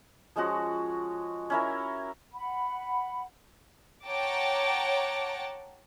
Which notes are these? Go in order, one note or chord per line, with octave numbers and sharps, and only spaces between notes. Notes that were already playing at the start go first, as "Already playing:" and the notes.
F3 G#3 C#4 F#4
C#4 E4 A#4
F#5 B5
C#5 F#5 G5 A5 A#5 D6